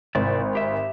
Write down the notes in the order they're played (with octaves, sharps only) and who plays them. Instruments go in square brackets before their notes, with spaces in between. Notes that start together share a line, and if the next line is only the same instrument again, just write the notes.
[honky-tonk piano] G#1 [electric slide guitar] C3 E4 D5
[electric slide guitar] G4 E5